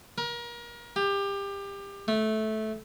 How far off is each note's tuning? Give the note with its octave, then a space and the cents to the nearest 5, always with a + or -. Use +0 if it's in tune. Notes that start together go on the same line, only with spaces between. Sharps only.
A#4 +30
G4 +25
A3 -15